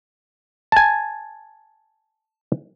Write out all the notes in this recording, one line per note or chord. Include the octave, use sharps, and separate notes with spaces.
G#5 A5